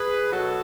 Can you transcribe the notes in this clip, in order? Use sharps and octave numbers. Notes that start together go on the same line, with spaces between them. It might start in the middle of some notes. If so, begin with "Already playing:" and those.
Already playing: G#4 B4
B2 F#3 F#4 A4